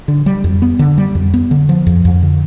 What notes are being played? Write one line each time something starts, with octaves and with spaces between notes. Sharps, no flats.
D3
G3
F2
B3
D3
G3
F2
B3
D3
F3
F2
F2
D3